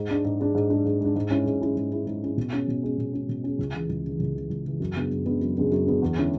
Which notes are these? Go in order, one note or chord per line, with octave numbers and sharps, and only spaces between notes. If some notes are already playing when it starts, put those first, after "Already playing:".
Already playing: G#2
G#3 D4
G#2
G#3 D4
G#2
G#3 D4
G#2
G#3 D4
G#2
G#3 C#4 E4
G#2
G#3 C#4 E4
G#2
G#3 C#4 E4
G#2
G#3 C#4 E4
B2
G#3 C#4
B2
G#3 C#4
B2
G#3 C#4
B2
G#3 C#4
C#2
C#3 E3
C#2
C#3 E3
C#2
C#3 E3
C#2
C#3 E3
F#2
C#3 G#3 B3 D4
F#2
C#3 G#3 B3 D4
F#2
C#3 G#3 B3 D4
F#2
C#3 G#3 B3 D4
E2
D3 G#3 C#4 E4